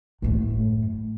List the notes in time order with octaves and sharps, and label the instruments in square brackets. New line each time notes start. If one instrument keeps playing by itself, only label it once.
[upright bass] F#2 A2